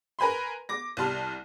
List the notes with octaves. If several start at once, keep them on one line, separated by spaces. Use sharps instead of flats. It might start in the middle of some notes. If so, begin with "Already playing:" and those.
A#4 B4 G#5 B5 C6
D6 A#6
C2 G3 A5 C6 F6